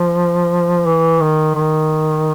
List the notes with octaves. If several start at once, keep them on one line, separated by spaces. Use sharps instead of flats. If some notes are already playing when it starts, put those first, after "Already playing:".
Already playing: F3
E3
D#3
D#3